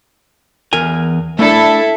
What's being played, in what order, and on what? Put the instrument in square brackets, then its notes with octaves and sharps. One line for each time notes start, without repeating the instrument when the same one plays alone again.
[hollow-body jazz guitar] E2 A#4 G#5
[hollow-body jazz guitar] A3 D4 [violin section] E4 A4